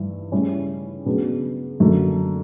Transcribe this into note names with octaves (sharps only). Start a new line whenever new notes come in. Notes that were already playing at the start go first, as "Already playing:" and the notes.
Already playing: G2 E3 E4
C#3 G3 C#4 E4
C#3 F#3 B3 D4
F#2 D3 A#3